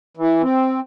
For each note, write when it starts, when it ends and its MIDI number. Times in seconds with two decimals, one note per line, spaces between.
0.17 0.42 52
0.42 0.80 60